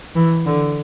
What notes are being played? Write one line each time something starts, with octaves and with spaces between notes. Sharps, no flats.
E3
D3